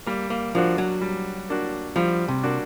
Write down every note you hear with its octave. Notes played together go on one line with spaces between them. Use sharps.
G3 A#3
A#3
F3 A#3 D4 F#4
F#3
G3
A#3 D4 F#4
F3 G3
C3
A#3 D4 F#4